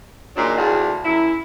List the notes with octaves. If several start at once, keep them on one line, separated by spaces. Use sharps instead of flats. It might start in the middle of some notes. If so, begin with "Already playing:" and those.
A#2 D#3 F#3 G#3 D4
D2 A2 D4 F4 F#4 G#4
F#2 E4